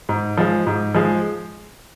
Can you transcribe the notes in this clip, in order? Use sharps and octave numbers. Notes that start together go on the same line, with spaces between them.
G#2
F3 G#3
G#2
F3 G#3